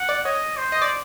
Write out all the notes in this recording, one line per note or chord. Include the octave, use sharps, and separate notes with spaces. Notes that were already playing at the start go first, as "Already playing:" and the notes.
Already playing: F#5
D5
C#5 D#5
C5
D#5
D5